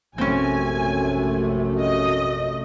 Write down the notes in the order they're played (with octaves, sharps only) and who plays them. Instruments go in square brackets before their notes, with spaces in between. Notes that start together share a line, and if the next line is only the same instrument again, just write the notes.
[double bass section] A#1 C3 A3 [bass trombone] F#2 [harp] C4 C#4 [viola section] G#5
[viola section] D#5